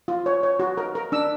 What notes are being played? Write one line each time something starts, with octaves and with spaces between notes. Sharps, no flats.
F4
C#5
C#5
F#4
A#4
A#4
D4 E6